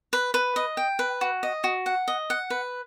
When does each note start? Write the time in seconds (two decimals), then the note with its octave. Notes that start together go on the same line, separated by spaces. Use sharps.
0.13 B4
0.34 B4
0.56 D#5
0.77 G5
0.99 B4
1.21 F#4
1.43 D#5
1.64 F#4
1.86 F#5
2.08 D#5
2.30 F#5
2.50 B4